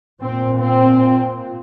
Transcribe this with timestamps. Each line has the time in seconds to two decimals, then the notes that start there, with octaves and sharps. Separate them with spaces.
0.21 A#2 C4
0.61 C4